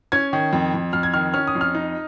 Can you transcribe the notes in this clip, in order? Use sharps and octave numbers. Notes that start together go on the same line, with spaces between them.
C#4 G#6
D#3
F2
F2
F2 F6
G#6
D#3 F6
C#4 F6
D#6
F2
F6
D#4